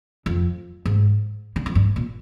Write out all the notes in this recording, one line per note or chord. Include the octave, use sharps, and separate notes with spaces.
F2
G#2
D3
F2
G2
A#2